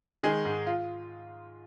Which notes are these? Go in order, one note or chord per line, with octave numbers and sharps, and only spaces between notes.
D#3 G#3 G#4
G#2
F4